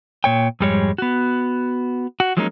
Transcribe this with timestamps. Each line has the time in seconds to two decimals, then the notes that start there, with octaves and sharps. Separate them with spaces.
0.24 A#2 C#5 G5
0.60 F2 G#2 G3 G#3 C#5
0.98 B3 F#4
2.20 F#4
2.37 F3 F#3 G#3 A#3 C#4 D#4